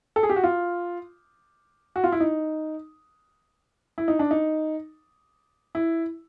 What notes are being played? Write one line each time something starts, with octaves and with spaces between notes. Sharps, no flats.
A4
G#4
G4
F#4
F4
F#4
F4
E4
D#4
E4
D#4
D4
D#4
E4